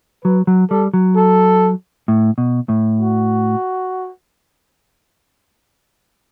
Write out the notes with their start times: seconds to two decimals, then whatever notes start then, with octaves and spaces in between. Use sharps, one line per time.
0.24 F#3 B4
0.47 F#3
0.70 G3 A4
0.94 F#3
1.16 A4
2.08 A2
2.38 B2
2.69 A2
3.00 F#4